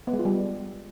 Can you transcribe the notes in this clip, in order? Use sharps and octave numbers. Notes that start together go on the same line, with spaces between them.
B3
G#3
F4
G3